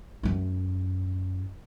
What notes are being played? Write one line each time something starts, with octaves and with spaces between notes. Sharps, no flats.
F#2 D#4